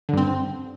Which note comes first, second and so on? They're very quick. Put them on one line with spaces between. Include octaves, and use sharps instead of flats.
D3 G2 C4